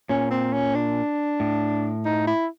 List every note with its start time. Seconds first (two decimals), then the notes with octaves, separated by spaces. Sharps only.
0.09 A#2 C#4
0.31 C4
0.53 C#4
0.74 D4
1.40 A2
2.05 D#4
2.27 E4